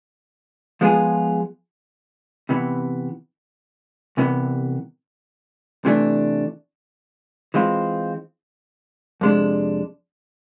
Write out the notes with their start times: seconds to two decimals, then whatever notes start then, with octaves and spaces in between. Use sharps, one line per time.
0.81 F3 G#3 B3 F4 G#4
2.49 C3 E3 B3
4.17 C2 C3 E3 B3
5.85 C3 E3 A3 D4
7.54 E3 G#3 C4 F4
9.21 F2 C3 G#3 D4